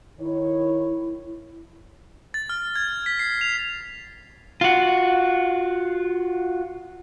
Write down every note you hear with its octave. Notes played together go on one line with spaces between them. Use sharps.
D#3 E4 C#5
A6
F6
G#6
B6
C7
F7
F4 F#4